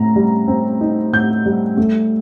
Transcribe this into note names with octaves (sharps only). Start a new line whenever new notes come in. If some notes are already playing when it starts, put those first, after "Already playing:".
Already playing: A2 C4 A#5
G3
C4
D#4
A2 G6
G3
A3